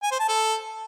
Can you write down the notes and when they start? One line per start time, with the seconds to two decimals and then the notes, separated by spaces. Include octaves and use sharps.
0.03 G#5
0.11 C5
0.20 A5
0.28 A4